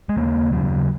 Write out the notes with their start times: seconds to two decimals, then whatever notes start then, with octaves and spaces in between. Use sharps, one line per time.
0.09 G#3
0.17 D#2 C#3 A#3
0.52 D#2 C#3 F#3